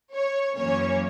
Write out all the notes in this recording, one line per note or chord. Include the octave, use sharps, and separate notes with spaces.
C#5
F#2 E3 A#3 C#4 C#5